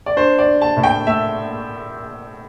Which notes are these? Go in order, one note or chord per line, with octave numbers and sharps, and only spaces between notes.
D5
D4 C5
D5
D4
A5
A2
G5
A3 E5